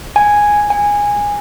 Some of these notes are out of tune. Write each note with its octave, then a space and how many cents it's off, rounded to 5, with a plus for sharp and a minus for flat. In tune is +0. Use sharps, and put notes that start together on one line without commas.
G#5 -5
G#5 -15